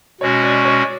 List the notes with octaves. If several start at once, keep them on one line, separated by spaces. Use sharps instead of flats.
B2 G#3 C#4 F#4 C#5
D5
C#5